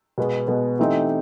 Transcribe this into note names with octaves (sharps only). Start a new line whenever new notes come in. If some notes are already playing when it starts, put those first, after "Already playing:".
B2 G#3 B3
B2 G#3 B3
E3 A3 C4 D#4 G4